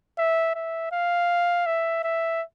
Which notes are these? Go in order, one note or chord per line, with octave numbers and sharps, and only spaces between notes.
E5
E5
F5
E5
E5